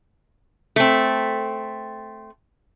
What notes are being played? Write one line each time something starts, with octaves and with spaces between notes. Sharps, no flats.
A3 C4